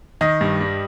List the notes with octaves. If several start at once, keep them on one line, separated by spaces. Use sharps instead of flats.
D#3 D#5
G2
G3